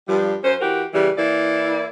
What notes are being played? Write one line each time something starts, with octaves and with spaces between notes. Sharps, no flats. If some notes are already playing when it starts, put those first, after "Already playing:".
G2 F3 G3
F#2 C#4 C5
E3 F#4 G4 A#4
C#3 E3 G3
E3 A#3 E4 D5